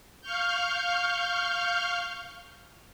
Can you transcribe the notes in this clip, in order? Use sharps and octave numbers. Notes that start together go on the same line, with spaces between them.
F5 C#6 F6 G6